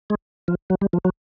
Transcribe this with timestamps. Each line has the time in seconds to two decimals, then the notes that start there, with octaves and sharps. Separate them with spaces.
0.10 G#3
0.48 F3
0.70 F#3
0.81 G3
0.93 F3
1.05 F#3